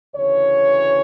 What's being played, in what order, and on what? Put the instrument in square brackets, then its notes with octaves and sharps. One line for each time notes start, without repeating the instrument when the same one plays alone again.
[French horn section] D2 C#3 E3 C#5